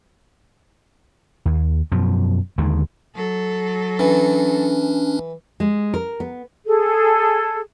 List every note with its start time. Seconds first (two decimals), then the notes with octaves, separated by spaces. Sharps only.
1.45 D#2
1.92 F#2 B2 F3
2.58 D#2 D3 D#3 G#3
3.15 F#3 A4
3.99 E3 C#4 D4
5.60 G#3
5.94 A#4
6.20 B3
6.66 G#4 A4